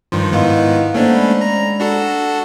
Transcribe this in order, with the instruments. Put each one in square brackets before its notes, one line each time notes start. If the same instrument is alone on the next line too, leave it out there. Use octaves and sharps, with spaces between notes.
[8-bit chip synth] G2 D#3 F3 [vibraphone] C6
[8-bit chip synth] G#2 D#3 B3 [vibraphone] E4 D#5 F5
[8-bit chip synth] A3 C#4 D4 [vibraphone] A#3 C5 F#5
[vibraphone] G#3 D5 B5
[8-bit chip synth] A#5
D4 F#4 A4